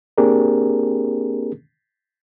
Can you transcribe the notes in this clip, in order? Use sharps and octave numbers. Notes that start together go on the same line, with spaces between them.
A#3 C4 D4 G4 G#4 A#4